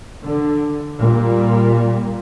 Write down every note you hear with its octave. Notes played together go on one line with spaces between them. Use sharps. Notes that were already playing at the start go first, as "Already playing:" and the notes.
D3
A#2 G3